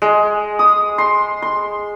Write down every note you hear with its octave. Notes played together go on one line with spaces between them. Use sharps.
G#3
D#6
C6
C6